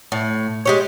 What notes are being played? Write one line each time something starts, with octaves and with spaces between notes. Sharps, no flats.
A2
G#3 G4 C#5